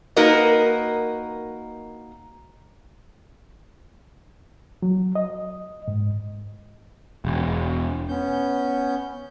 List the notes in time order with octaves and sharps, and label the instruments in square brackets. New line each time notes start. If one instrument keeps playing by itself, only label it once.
[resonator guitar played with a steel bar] A#3 D#4 F#4 A#4 B4 D#5
[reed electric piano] F#3
D#5
G#2
[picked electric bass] E1
[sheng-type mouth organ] B3 C#4 G6